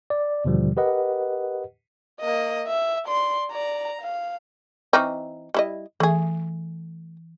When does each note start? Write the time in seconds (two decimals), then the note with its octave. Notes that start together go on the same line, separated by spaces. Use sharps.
0.10 D5
0.45 D#2 B2 D3 F3 G3
0.77 G4 A#4 B4 D#5 F#5
2.20 A#3 D#5
2.67 E5
3.05 D5 C6
3.51 D5 A#5
4.01 F5
4.93 E3 C4 D#4 C#6 D6 F6
5.54 G3 E4 D#5
6.00 E3 A3 G#4